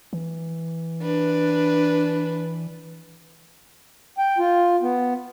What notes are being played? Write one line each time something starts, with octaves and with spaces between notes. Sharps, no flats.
E3
D4 B4
G5
F4
B3